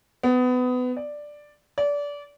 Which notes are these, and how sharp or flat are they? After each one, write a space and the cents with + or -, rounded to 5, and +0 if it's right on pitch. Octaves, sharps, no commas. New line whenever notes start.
B3 +25
D5 +5
D5 -25